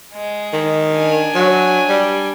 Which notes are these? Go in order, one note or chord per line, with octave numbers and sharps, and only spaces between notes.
G#3
D#3
D4 G#5
F#3
G3